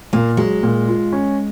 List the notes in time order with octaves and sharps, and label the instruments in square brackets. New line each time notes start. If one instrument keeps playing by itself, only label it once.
[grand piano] A#2 [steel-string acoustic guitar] A#3
[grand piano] F#3 [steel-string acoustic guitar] G#3
[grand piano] A#2
F4
C#4